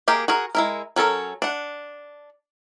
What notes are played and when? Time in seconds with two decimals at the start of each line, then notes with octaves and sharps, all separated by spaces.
0.08 A#3 G4 G#4 A#4
0.28 F#4 G#4 A#4
0.55 G#3 E4 A#4
0.96 F#3 C#4 A4 A#4
1.42 D4 F#5